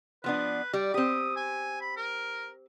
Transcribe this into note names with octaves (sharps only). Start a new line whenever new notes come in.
F3 B3 D4 B4
G3 D5
C4 G4 D#6
G#5
B5
A#4